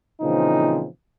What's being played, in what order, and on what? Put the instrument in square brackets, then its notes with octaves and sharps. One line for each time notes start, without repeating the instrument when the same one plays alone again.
[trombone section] A#2 C#3 E3 F3 C4 D#4